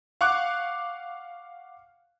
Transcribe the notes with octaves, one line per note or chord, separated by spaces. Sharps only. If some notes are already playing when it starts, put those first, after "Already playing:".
F5 F#5 C#6 D6 F#6